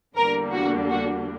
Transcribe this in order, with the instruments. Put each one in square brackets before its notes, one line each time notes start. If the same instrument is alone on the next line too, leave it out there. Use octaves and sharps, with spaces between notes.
[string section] E2 D3 G3 A#3 D4 A#4
F#4
F#4